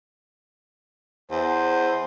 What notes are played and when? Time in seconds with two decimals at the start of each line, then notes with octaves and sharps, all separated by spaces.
1.31 E2 C5